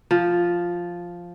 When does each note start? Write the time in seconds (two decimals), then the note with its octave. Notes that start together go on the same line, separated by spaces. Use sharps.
0.11 F3